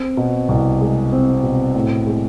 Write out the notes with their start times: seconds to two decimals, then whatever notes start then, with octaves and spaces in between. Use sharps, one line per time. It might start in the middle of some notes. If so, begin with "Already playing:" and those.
Already playing: C4
0.17 B2
0.49 C2
0.81 G#3
1.12 C4
1.43 B2
1.75 A2
2.07 G#3